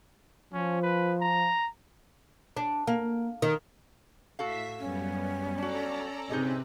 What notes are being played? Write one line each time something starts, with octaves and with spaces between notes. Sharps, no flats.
F3 C#4
B4
A#5
D4
A#3
D#3
A2 F#4 A4 E5 F5 B6
F#2 G3 B3 C#4
D4 F#4 A4 D5 A#5
C3 C4 D#4 G#4 B4 D#5